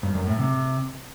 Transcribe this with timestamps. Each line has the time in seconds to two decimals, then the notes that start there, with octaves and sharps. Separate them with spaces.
0.03 G2
0.15 F#2
0.27 A2
0.39 C3